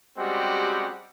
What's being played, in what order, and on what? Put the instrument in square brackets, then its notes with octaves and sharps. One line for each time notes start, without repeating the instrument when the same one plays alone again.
[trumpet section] G3 G#3 C4 C#4 F#4 G4